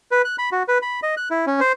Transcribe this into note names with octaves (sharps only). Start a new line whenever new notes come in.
B4
F#6
B5
F#4
B4
B5
D#5
F#6
E4
C#4
C5